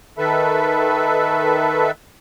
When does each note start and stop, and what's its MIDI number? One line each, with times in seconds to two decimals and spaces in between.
0.18 1.91 51
0.18 1.91 69
0.18 1.91 71
0.18 1.91 76